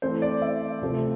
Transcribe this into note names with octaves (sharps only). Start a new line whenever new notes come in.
E3 A3 C4 C5
D5
E5
C3 F3 A3 C4